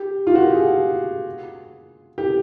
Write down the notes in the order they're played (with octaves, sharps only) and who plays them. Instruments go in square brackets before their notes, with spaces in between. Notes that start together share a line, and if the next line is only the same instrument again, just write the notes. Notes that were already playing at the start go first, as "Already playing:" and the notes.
Already playing: [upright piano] G4
F4
F#4
G4
G#4
G4